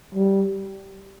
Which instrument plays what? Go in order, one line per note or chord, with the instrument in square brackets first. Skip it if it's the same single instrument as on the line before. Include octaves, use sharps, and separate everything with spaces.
[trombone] G3